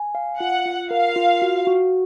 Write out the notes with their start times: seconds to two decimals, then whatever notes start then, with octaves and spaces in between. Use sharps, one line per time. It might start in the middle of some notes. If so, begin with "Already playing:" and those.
Already playing: G#5
0.15 F5
0.39 F4 F#5
0.65 F4
0.91 A#4 F5
1.16 F4
1.42 F#4
1.67 F#4